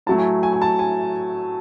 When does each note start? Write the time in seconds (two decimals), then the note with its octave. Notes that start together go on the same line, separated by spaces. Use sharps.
0.06 A2 F#3 A3 A5
0.18 G#5
0.43 G#5
0.53 G#5
0.62 A5
0.79 G#5